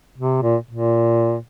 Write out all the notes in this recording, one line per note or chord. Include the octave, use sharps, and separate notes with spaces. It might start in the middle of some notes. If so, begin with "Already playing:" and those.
C3
A#2
A#2